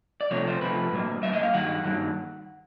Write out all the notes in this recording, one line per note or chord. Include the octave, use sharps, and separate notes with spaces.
D5
C3 F3 A3 C#5
C5
C3 F3 A3 B4
A2 F#3 A#3
A2 F#3 A#3 E5
D#5
F5
G2 D#3 F#3 F#5
G2 D#3 F#3 A#3